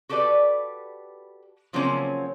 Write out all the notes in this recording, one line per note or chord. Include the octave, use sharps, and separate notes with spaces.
F#4 G4 A4 B4 D5
C#3 F3 F#3 A#3 C4 C#4